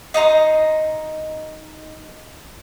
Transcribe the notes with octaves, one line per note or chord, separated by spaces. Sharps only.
D#4 D#5 A#5 C6